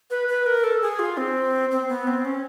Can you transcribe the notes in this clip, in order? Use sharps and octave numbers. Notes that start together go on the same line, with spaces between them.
B4
B4
A#4
A4
G#4
F4
C4
C4
B3
C4
C#4